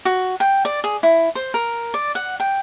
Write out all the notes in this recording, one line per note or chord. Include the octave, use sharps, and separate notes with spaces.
F#4
G5
D5
G#4
E4
C5
A#4
D5
F#5
G5